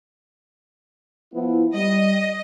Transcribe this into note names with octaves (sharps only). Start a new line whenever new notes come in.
F3 B3 E4
G3 D#5